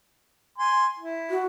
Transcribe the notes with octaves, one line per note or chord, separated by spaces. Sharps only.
G#5 C6
E4
F#4